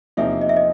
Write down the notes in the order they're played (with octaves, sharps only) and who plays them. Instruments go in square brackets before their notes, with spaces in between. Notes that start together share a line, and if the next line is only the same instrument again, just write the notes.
[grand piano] E2 C3 F3 A#3 D#4 [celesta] E5
[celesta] D#5
E5
D#5